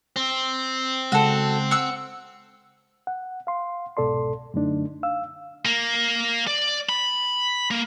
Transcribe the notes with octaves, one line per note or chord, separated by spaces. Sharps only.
C4
C#3 G#3 F#4 A4
F#5 E6
F#5
F5 C6
C2 G#2 B2 A4 D5 C6
F#2 D3 A3 D4 D#4
F5 E6
A#3
D5
B5
A#3